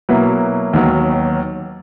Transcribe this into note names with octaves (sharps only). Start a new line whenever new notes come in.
B2 F#3 A#3 E4 B4
D#2 D#3 F#3 B3